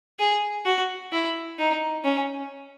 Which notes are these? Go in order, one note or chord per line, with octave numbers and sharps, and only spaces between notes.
G#4
F#4
E4
D#4
C#4